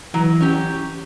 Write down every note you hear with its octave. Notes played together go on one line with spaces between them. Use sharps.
E3 F#3
C#4 G4